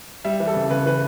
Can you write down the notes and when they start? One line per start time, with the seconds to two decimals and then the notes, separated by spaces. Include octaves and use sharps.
0.24 G3 E5
0.40 E3
0.47 A4
0.55 C#3
0.70 C#3 B4
0.86 E3 B4